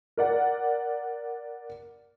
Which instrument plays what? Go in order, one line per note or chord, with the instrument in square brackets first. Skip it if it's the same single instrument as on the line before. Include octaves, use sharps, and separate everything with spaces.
[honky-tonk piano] A#4 D5 F#5